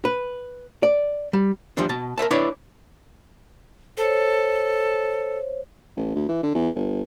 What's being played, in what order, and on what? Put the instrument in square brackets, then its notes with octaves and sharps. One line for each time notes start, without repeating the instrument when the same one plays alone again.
[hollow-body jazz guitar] B4
D5
G3
E2 F3 G3 D4
B2 A5
A#4 C#5 E5 A5
D4 E4 B4 C#5 D5 E5
[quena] A4 [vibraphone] C5 C#5
[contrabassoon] A1
D2
E3
D3
E2
G1